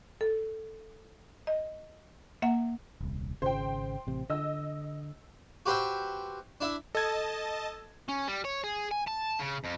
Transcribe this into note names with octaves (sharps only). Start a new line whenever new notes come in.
A4
D#5
A#3 E5 F#5
D#1 C2
G#1 C#3 C5 G5
A1 C3
D3 D#5 E6
F#4 G4 B4 C5 E5 G5
D4 E4 E5
A4 D#5 A5 G#6
C#4
G3
C#5
G#4
G#5
A5
C#3
F2